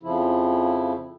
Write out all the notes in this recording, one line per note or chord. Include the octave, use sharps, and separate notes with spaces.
F2 C#3 F3 E4